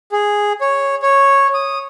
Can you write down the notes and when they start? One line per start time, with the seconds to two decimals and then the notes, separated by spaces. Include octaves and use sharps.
0.12 G#4
0.61 C#5
1.02 C#5
1.54 D#6